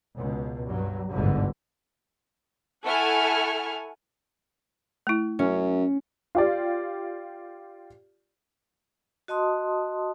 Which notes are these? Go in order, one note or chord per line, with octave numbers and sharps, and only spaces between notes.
C#2 B2
G2 F#3
G1 C2 G#2 B2 D3
E4 A4 F#5 G#5 C#6 F6
A3 E4
F#2 C#4
F4 G4 D5
F#4 D#5 A5 C6 D#6